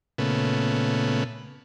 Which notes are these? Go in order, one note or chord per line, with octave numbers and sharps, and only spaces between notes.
A#2 C#3 A3 B3